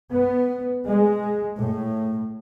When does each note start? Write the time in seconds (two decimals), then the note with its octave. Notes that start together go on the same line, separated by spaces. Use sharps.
0.11 B3
0.87 G#3
1.56 A2